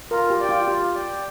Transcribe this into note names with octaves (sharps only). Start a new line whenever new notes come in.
F4 A#4
G4
D5 G5
F4
F4 G4
D5 G5